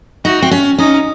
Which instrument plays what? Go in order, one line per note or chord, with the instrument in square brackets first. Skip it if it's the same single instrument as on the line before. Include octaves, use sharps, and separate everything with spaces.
[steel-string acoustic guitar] D#4 [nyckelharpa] F#4
[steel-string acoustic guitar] C4
C#4
[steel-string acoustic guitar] C#4 [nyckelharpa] D#4